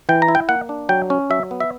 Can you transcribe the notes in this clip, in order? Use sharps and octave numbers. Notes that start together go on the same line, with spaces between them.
E3 G5
A#5
E4
G5
A#3 F#5
D4
F#3 G5
C#4
F#3 E5
B3
E5